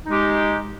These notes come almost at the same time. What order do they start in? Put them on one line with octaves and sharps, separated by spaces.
D#4 G#3 G4